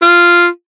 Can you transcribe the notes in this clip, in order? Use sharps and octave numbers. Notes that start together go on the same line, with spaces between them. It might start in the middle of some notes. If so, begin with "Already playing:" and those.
F4